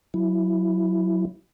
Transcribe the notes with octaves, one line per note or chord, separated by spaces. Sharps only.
F#3 E4